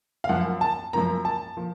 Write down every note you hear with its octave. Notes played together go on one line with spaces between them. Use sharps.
F5
F#2 F3 A#3 F#5
A5
F#2 F3 A#3 A#5
A5
F3 A#3